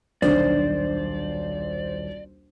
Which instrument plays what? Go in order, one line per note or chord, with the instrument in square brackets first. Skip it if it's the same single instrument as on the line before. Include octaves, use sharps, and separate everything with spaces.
[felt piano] D#1 B1 [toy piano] D4 A4 [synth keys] C5 [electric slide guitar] D5